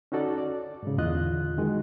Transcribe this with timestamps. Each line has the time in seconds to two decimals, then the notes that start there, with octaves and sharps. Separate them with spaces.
0.12 C#4 D#4 F#4 A4 D5
0.38 D5
0.83 G#2 C#3
0.98 E2 A#2 D3 F4 D#5 F#6
1.58 D#3 G#3 F#4